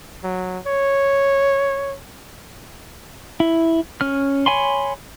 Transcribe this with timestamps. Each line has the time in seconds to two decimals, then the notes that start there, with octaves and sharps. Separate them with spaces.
0.24 F#3
0.67 C#5
3.40 E4
4.01 C#4 F6
4.46 C#5 G#5 B5 C6